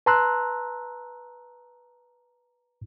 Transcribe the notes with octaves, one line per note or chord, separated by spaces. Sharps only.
B4 A5 A#5 C6 E6 F#6